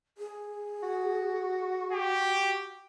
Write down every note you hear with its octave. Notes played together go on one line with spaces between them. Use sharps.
G#4
F#4
G4